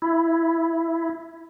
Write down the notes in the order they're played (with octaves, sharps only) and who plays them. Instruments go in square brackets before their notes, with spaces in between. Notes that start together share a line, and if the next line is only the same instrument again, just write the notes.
[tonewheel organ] E4